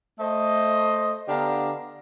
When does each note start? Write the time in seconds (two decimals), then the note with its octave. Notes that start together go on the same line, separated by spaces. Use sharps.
0.19 A3 C5 D#5
1.28 D3 B3 D4 G4 F5 A#5